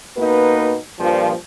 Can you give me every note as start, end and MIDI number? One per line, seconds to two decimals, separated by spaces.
0.17 0.76 47
0.17 0.76 58
0.17 0.76 63
0.17 0.76 71
0.99 1.32 43
0.99 1.32 46
0.99 1.32 53